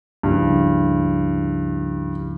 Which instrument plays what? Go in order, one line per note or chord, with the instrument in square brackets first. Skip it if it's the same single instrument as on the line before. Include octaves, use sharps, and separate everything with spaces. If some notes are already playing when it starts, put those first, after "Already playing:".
[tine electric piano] C#2 C#3 F3 A#3 E4 [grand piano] G2